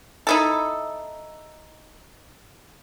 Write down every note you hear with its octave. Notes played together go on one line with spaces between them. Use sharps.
D#4 E4 A4